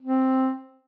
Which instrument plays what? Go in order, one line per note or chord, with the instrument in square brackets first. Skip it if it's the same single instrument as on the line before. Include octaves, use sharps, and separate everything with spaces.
[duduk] C4